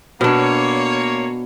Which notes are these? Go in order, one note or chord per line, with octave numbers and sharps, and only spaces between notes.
B2 A#3 D4 C#5